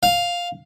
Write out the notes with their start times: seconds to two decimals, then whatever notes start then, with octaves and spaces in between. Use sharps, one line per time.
0.03 F5